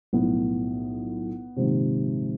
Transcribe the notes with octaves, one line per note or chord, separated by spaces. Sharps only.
B1 A2 F3 B3
A#1 G#2 C3 D#3 C4